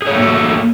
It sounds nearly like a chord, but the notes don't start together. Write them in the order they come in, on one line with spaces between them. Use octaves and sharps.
G#4 C#5 A3 A#3 F#4